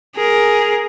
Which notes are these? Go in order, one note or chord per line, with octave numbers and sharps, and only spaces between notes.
G#4 A#4